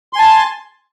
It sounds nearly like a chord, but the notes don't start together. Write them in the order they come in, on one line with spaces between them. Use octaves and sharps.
C6 G#5 A5